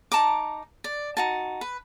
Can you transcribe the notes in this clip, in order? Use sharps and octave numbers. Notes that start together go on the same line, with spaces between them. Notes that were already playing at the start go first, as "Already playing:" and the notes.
D#4 A5 A#5 D6
D5
D#4 F#4 A5
B4